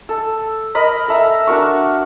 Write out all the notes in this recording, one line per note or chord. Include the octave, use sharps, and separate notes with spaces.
A4
A#4 D#5 A#5 B5
A4 E5 A#5
D4 F#4 A#4 C#6